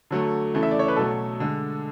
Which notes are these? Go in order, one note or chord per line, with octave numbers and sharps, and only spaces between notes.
D3 F#3 A3
C#3 E3 A3
E5
D5
C#5
B4
B2 F#3 A3 A4
D3 G#3